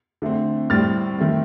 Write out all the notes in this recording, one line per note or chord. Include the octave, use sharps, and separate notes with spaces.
D3 A3 C4
A2 G3 C4 F6 A6
D#3 A3 C4